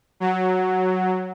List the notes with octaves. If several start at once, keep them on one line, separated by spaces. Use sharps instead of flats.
F#3